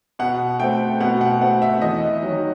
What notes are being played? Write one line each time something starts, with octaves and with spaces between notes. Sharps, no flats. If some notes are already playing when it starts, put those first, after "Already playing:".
B2 F#5
A3 C4 G5
B2 F#5
F#5
A3 C4 F#5
E5
E2 D#5
D#3 F#3